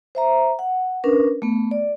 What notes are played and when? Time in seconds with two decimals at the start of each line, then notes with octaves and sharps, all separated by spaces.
0.15 C5 E5 A#5
0.59 F#5
1.04 C#4 D4 A#4 B4
1.42 A3 B3
1.71 D5